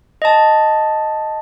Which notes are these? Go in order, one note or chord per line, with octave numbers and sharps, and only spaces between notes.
D#5 A5